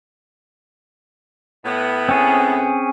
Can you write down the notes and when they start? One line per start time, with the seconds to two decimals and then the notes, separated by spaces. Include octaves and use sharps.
1.65 A2 B3
2.09 C4 C#4 G#4